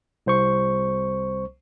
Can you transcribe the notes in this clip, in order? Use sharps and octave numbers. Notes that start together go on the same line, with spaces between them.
C2 C5 C#6